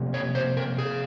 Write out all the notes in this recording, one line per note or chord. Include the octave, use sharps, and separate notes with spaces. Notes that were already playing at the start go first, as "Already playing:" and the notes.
Already playing: C3 F3 A#3
C#5
C5
A#4
G#4